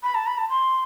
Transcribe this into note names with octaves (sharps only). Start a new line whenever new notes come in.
B5
A5
B5
A5
C6